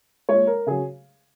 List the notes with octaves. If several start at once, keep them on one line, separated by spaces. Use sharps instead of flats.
A#2 G#3 C#5
A#4
C#3 F#3 G#4